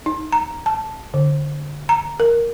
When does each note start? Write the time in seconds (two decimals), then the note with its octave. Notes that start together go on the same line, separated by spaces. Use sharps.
0.06 D#4
0.32 A#5
0.66 A5
1.14 D3
1.89 A#5
2.20 A#4